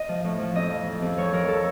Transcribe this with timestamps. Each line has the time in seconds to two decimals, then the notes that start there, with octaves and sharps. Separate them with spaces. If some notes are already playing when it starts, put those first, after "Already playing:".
Already playing: D#5
0.09 F3
0.24 A2
0.39 F3
0.56 F2 D#5
0.71 F3
0.86 F3
1.02 F2
1.17 F3 C#5
1.33 F3 A#4
1.48 F3 A4